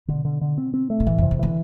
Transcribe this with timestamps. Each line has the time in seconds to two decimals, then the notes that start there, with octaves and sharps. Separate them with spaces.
0.08 B2 D3
0.25 D3
0.41 D3
0.58 C4
0.74 C4
0.90 A3
1.00 B2
1.07 A2 E3
1.18 F2 C3
1.31 E2
1.39 D3 E3